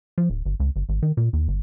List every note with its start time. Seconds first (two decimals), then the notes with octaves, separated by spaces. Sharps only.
0.18 F3
0.30 D1
0.46 G1
0.60 C#2
0.76 G1
0.89 G#1
1.02 D#3
1.17 A#2
1.33 D#2
1.48 G1